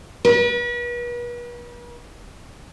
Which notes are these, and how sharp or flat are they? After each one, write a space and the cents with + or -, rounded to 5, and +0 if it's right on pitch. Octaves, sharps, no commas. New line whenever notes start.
B4 -40